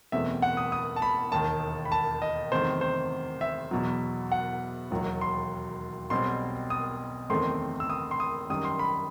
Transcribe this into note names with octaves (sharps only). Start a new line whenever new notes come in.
F#1 E2 B2 A3 C4 E5
F#5
D#6
D#6
A5
B5
E1 D#2 D#3 A5
B5
A5
D#5
F#1 E2 C3 D#3 A3 C5
C5
E5
E2 B2 F#3
F#5
E1 D#2 D#3 F#3
C6
B1 B2 G3 C4 C6
D#6
F#1 E2 D#3 A3 C4 C6
E6
D#6
C6
D#6
F#2 D#3 G3 D#6
C6
B5